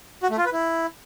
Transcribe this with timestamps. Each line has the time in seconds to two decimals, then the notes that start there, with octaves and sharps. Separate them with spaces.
0.23 F#4
0.30 A3
0.38 F4
0.45 B4
0.52 E4